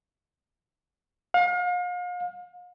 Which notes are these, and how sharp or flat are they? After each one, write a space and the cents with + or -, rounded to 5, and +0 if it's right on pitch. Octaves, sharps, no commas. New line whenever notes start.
F5 +40